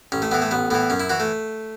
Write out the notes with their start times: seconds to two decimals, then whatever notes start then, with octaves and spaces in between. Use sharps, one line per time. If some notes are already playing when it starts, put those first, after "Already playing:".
0.12 A1 C#4
0.22 A3
0.31 A2 E3 B3
0.42 A3
0.51 A1 B3
0.70 A2 E3 B3
0.90 F#2 C#4
1.00 E4
1.10 E3 F#4
1.20 A3